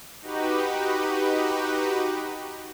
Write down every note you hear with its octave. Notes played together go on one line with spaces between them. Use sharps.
D#4 F#4 G4 B4